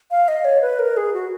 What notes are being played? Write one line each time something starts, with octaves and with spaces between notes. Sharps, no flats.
F5
D#5
C#5
B4
A#4
G#4
F#4